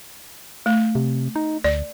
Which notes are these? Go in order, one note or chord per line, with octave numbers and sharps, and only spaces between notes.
A3
C3
D#4
D2 D5